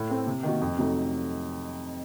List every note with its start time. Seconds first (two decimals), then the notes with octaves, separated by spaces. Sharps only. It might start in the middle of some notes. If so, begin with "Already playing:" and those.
Already playing: A2
0.09 A3 C4
0.27 C3
0.43 D#3 A#3 D#4 F#4
0.61 F2
0.78 C3 F#3 A3 D#4